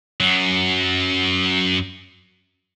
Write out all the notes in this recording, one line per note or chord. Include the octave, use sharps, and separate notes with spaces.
F#2 F#3